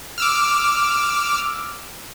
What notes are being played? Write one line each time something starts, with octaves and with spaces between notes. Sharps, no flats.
D6 E6 F6